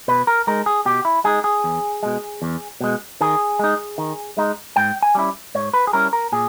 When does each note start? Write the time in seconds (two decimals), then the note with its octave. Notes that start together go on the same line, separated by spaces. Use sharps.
0.08 B2 B4
0.27 A#4
0.47 G#3 D#4 A#4
0.66 G#4
0.85 B2 G4
1.05 E4
1.24 G#3 D#4 G#4
1.44 G#4
1.64 E2
2.03 B2 G#3
2.42 E2
2.81 B2 G#3
3.21 D#3 G#4
3.59 G#3 D#4
3.98 D#3
4.37 G#3 D#4
4.76 G#2 G5
5.02 G#5
5.15 G3 C#4 E4
5.55 G#2 C#5
5.73 B4
5.87 G#4
5.93 G3 C#4 E4 A#4
6.13 A#4
6.32 A#2 G#4